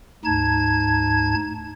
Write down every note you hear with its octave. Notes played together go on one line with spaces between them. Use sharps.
D2 G#2 D#4 A5 G#6